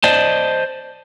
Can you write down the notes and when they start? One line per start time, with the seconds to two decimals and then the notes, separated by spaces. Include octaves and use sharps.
0.04 C5 D5 D#5 A5